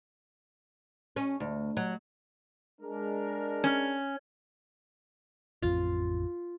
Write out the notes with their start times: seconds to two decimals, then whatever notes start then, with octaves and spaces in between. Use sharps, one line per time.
1.16 C#4
1.40 D2
1.77 F#3
2.81 G#3 D4 A#4
3.64 C#4
5.62 A1 F2 C4 F4